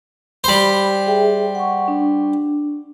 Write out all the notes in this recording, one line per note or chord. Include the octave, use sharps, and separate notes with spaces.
G3 C5 B5
G#4 E5 G5
F#5 C#6
D4